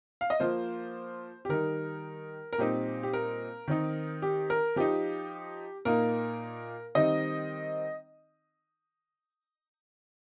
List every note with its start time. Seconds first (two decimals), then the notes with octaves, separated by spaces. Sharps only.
0.21 F5
0.30 D#5
0.40 F3 A#3 F4 C5
1.45 G4
1.49 D#3 G3 D#4 A#4
2.53 A#4
2.58 A#2 G3 C4 D#4 G4
3.03 G4
3.13 A#4
3.68 D#3 C4 D#4
4.22 G4
4.50 A#4
4.76 F3 D#4 G4
5.85 A#2 A#3 D#4 A#4
6.95 D#3 G3 C4 D#4 D#5